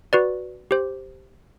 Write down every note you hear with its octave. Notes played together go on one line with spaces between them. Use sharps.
F#4 B4 D5
G4 C5